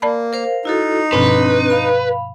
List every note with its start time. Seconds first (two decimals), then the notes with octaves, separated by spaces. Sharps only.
0.02 A#3 D5 A5 B5
0.33 A#4 C5 F5
0.65 D#4 E4 F#4 A4
1.13 G2 B2 F3 C4 D4 B4
1.70 F5 B5